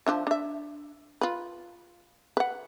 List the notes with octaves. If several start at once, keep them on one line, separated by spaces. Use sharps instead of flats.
F3 D4 E5
D4 E5
F4 B4
B4 F#5